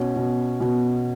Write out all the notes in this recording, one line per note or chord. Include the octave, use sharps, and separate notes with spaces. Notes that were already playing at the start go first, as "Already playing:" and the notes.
Already playing: B2 C#4
B2
B2